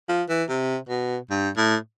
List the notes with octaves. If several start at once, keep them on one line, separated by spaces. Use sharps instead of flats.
F3
E3
C3
B2
G2
A2